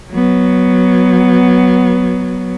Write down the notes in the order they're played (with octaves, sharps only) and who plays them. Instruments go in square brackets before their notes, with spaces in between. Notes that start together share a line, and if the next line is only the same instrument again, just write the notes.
[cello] F#3 B3